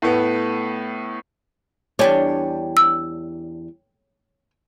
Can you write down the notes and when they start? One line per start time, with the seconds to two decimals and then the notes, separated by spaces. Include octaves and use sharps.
0.02 A2 A3 B3
1.99 E2 G3 D4 C#5 G5 G#5
2.77 E6